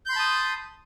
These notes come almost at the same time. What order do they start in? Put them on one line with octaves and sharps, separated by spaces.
G6 C6 B5 A5 D#6